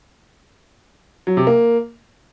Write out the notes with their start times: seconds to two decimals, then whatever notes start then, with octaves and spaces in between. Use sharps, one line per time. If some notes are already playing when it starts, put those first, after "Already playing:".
1.27 F#3
1.37 C3
1.47 A#3